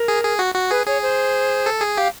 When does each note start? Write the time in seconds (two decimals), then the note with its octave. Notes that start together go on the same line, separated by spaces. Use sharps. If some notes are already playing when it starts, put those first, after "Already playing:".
Already playing: A#4
0.08 G#4
0.24 G#4
0.39 F#4
0.55 F#4
0.71 G#4 B4
0.87 G#4 C#5
1.02 C5
1.66 A4
1.81 G#4
1.97 G4 F5